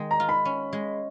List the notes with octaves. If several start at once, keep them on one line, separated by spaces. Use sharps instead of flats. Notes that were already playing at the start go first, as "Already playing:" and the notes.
Already playing: D#3 G#3
A#5
F4
B5
C#4
G#3